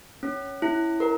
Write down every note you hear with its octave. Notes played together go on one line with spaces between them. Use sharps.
C#4
E4
A#4